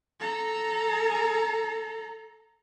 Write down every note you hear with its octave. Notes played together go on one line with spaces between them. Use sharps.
A4 A#5